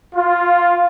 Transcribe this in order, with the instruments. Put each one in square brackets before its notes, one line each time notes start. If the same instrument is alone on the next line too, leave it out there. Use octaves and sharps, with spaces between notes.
[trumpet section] F4